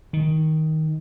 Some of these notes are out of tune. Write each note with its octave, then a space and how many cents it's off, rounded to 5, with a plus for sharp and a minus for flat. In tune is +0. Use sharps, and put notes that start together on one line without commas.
D#3 +10